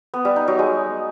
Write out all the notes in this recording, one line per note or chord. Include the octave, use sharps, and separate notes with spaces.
B3
G3
D#4
F#3
G#3